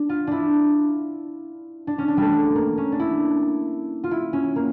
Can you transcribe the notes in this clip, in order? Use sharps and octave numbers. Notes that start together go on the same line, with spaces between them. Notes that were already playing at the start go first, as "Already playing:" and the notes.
Already playing: D4
F4
D4 E4
D4
C#4
D4
G3 A3
A#3
C#4
D4
E4
F4
E4
C#4
A#3